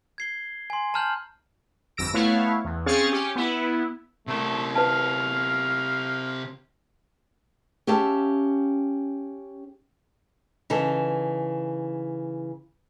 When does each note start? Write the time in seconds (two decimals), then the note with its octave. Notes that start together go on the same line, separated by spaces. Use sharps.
0.18 G#6 C7 G7
0.70 G#5 C6
0.94 A5 A#5 F6 G6 F#7
1.97 G1 F2 E6 A#6 D7
2.14 A3 B3 E4 C#5 F5
2.65 E2
2.86 C4 C#4 G#4 F5 C#6 A6
3.09 C#4 G4
3.36 B3 E4
4.27 C3 A3 A#4
4.75 B4 F5 A5
7.87 C#4 G4 E5 F5 A5
10.70 C#3 E3 D#4 A4